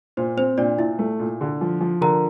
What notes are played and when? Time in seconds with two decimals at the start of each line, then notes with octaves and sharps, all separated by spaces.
0.17 A#2 C5
0.37 C4 C5
0.58 A#2 D4 D5
0.79 A#2 E4 E5
0.99 A3
1.19 A#2
1.41 D3
1.61 F3
1.81 F3
2.01 D3 A#4 A#5